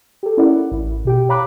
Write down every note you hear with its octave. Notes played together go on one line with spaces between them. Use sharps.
G4 A4
C#4 E4 A#4 D5 F#5
A1 E4
B2 G4 G5
C#5 F5 A#5 B5 D6 F#6